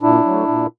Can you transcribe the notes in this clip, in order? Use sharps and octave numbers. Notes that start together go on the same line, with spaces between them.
A#2 D4 E4
F#3 A3
A#2